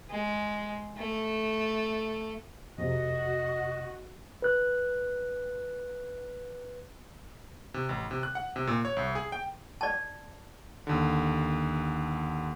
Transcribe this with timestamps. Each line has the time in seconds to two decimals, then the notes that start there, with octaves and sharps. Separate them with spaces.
0.10 G#3
0.97 A3
2.78 F2 C3 F#4 D#5
4.42 B4 F#6
7.74 C3
7.89 A1
8.11 C3
8.23 F#6
8.35 F#5
8.56 C3
8.67 A#2
8.85 C#5
8.97 C2
9.15 G#4
9.32 G5
9.81 D5 A5
10.87 D#2 D3